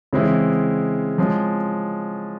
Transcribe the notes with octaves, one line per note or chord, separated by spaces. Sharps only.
C#3 E3 G#3 C4 E4
F3 G#3 C#4